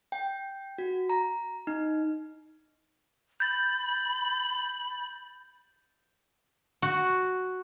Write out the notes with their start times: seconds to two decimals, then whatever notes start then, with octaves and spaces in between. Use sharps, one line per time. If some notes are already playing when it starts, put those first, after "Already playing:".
0.12 G5
0.78 F#4
1.10 A#5
1.67 D#4
3.40 B5 G6 A6
6.82 F#4